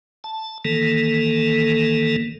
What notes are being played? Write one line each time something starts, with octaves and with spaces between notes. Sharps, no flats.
A5
D#3 E3 A#3 A4